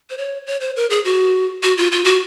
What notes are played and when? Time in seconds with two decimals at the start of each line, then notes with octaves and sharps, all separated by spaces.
0.10 C5
0.18 C#5
0.47 C#5
0.61 C5
0.76 A#4
0.90 G#4
1.05 F#4
1.63 F#4
1.78 F4
1.92 F4
2.04 F#4